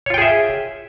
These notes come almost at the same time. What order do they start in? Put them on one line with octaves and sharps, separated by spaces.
C#5 F4 G5 G#4 E5